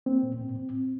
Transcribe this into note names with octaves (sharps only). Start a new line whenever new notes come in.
A#3 C4
A#2
A2